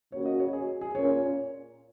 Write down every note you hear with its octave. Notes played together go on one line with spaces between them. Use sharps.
C#3 A#3 F#4 C#5
D#5
C#5
G#4
G#4
A#2 A#3 C#4 C#5